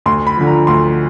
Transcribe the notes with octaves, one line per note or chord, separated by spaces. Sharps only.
D2 C6
B5
D3 F3
A#5
D2 C6